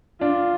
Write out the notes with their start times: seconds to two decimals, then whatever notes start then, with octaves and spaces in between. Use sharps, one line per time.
0.21 D4 F4